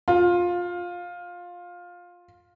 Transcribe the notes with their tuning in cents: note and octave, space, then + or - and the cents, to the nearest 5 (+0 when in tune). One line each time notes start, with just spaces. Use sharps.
F4 +15